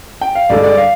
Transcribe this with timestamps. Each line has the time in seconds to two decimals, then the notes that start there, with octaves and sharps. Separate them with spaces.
0.21 G5
0.35 F5
0.50 G2 D3 G#3 D5
0.64 D5
0.77 F5